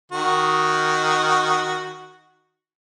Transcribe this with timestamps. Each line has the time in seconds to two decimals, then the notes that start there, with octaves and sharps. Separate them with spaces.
0.12 D#3 F#4